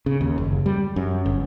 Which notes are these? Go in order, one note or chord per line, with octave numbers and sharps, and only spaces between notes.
C#3
D#2
F#1
G3
F#2
G1